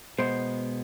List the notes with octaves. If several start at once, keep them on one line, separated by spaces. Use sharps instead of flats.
B2 G#3 B3 C5